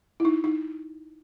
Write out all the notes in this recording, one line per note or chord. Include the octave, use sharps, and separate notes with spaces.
E4
D#4
D#4